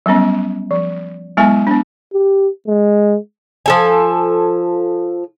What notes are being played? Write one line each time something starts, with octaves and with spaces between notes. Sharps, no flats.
F#3 G3 B3 C#4
F3
F#3 G#3 B3 E4 G#5
B3 D4
G4
G#3
F3 A4 G#5